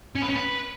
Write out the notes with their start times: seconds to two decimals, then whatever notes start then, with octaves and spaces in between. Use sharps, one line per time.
0.16 C#4
0.22 B4
0.29 C#4
0.36 B4